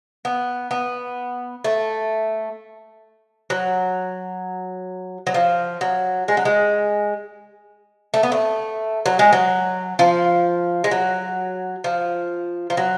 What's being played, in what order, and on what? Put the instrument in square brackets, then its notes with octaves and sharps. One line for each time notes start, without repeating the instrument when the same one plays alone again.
[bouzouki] B3
B3
A3
F#3
F#3
F3
F#3
G#3
F#3
G#3
A3
B3
A3
F#3
G#3
F#3
F3
G#3
F#3
F3
F3
F#3